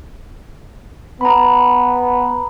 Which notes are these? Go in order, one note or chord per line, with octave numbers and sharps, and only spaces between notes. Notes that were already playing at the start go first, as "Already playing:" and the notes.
B3 A#5 B5